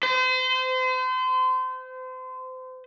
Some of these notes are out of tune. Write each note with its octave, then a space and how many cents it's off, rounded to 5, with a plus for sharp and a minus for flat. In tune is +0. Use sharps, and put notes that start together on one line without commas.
C5 -35